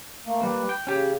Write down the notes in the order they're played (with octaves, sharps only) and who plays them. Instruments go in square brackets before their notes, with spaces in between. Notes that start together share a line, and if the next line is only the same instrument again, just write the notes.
[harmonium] A3 A#3
[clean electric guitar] G3 A#3 [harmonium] G4 B4
[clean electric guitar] G5
[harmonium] C#3 [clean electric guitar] C#4 G4